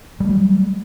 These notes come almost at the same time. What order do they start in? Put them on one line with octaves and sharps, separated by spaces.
G3 A3 F#3